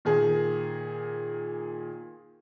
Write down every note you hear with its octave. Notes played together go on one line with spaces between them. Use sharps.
A#2 D#3 G#4